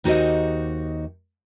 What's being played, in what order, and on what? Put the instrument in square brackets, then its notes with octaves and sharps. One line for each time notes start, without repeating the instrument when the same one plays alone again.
[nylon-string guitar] D#2 D#4 F#4 G4 C5 D#5